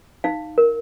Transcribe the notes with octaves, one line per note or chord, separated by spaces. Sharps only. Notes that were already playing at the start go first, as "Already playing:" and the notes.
D#4 F5
A#4